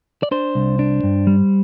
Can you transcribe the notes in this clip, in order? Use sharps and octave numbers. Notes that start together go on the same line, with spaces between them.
D5
D4 C5
C2
D4
G2
G3